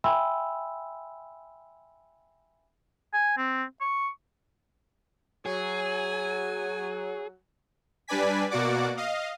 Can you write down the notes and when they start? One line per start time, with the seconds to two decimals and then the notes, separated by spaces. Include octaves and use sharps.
0.04 E5 G5 G#5 B5 C6 E6
3.13 G#5
3.37 C4
3.81 C#6
5.46 F#3 G#4 G#5
8.08 G3 D4 B4 D5 G#5 B6
8.50 B2 A#3 F#4 D5 F#5 D6
8.97 D#5 F5